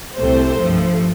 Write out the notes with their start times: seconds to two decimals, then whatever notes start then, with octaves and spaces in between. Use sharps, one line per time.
0.16 C2 C3 A3 C5
0.57 G2 F3 A3